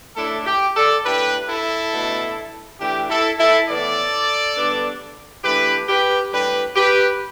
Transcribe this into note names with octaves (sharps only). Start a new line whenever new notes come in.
A2 A3 D4 E4 A4
G4
A4 D5
A2 A3 D4 G4 B4
E4 A4
B2 A3 D4
E3 A3 D4 G4
E4 A4
E4 A4
A2 E3 B3 A4 D5
D3 G3 B3 D4
E3 A3 D4 G4 B4
G4 B4
A2 G3 D4 G4 B4
G4 B4